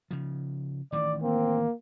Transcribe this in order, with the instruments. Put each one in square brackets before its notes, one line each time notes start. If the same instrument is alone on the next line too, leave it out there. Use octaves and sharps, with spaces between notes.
[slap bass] C#3 F3
[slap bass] A1 D#3 E3 [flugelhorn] D5
[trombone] A#3 [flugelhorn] C4